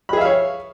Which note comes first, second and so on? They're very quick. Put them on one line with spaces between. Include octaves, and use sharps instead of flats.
B5 G#4 E5 F5 C#5